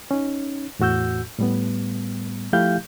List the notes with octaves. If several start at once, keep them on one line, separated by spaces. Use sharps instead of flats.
C#4 D#4
E2 A2 F#4 E6 G6
A2 G3 B3
F3 A3 E4 G4 F5 G6